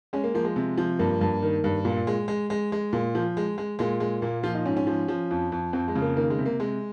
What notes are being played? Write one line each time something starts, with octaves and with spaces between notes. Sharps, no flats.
G#3 C#4
A#3
F3 A#3
G#3
C3
F3
G2 A#3
G2
D#3
G2
A#2
G#3
G#3
G#3
G#3
A#2
F3
G#3
G#3
A#2 G#3
G#3
A#2 A#3
F3 F4
D#4
G#2 C#4
C#4
F3
F3
F2
F2
F2 C4
G#3
C#3
A#3
D#3 A#3
G#3
C3
A#3
C3 G#3